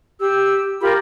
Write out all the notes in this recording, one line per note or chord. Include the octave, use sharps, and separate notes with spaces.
G4 E6
F4 G4 A#4 B5